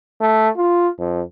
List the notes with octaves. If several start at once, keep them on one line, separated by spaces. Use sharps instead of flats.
A3
F4
F2